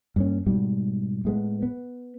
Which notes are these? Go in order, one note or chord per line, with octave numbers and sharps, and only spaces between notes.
G2 A#3 C#4
G#2 B2 G3
A2 G#3 B3
B3